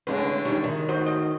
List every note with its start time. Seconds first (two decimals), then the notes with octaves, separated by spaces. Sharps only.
0.07 A2 D3 G#3 C#4 B4
0.45 D#3 G3 D#4 C#5
0.64 D#3
0.89 A2 F#4 C5 D#5
1.06 D#5